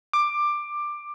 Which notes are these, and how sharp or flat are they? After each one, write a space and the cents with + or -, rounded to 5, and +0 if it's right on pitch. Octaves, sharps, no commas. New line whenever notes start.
D6 +15